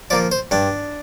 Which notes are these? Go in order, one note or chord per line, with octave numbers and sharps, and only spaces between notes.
F3 A#3 D5
C5
G2 D4